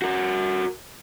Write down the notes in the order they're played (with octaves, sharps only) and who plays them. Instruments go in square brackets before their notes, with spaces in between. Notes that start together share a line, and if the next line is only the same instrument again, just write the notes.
[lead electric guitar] F#4 A#4